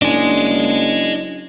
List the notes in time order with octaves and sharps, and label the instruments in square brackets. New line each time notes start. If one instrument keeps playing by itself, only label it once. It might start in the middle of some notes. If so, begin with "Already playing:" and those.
[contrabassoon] F#1 [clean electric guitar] D4 [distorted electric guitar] D#5 G#5